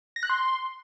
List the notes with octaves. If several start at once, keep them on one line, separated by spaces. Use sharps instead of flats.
A#6
F#6
C6